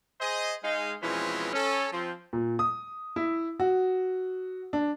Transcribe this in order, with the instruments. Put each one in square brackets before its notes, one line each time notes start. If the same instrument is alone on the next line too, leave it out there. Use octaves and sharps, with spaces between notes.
[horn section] G#4 C5 D#5
G#3 D#4 F5
B2 E3 F3 G#3 C4 C#4
C#4 A4
F3 C4
[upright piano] A#2
D#6
E4
F#4
D4